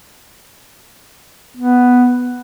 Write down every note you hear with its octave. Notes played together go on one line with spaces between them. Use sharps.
B3